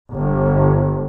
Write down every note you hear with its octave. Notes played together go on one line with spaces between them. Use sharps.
G1